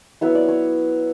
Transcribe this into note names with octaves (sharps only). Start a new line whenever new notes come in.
F#3 B3 E4 C#5
D5
C#5